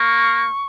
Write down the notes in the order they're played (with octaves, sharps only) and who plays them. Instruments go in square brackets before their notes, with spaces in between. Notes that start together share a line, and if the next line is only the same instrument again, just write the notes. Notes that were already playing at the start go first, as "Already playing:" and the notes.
Already playing: [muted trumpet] A#3 [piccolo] C#6